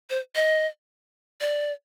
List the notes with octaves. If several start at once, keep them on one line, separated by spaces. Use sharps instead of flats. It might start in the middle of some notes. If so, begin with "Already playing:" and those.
C5
D#5
D5